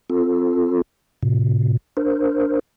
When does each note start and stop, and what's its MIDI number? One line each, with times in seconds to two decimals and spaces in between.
0.10 0.82 60
0.10 0.82 65
0.10 0.82 69
1.23 1.77 45
1.23 1.77 48
1.97 2.59 62
1.97 2.59 70
1.97 2.59 72